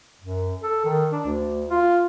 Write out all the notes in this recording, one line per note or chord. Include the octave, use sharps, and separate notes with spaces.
F#2
A4
D#3
D4
D2
F4